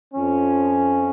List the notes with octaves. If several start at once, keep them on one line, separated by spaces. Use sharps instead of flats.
F2 F3 C#4